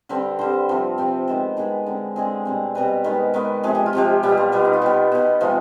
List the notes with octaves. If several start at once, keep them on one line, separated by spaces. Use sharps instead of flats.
D3 G3 C4 B4
D3 G3 C4 C5
C3 F3 C4
C3 F3 C4 D5
D#3 G#3 B3 C5
D#3 G#3 B3 G#4
D3 G#3 C4
D3 G#3 C4 G#4
B2 G3 C4
B2 G3 C4 B4
D#3 G#3 B3
D#3 G#3 B3
C3 F3 G#3 G#4
G4
F4
C3 F3 G#3 G4
B2 G3 B3
G4
F4
B2 G3 B3
D#4
F4
B2 B3 G4
B2 B3
C3 F3 G#3 C4 F4